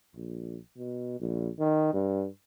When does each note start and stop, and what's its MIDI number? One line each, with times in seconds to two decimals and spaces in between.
0.15 0.58 34
0.77 1.17 47
1.20 1.49 34
1.59 1.90 51
1.93 2.27 43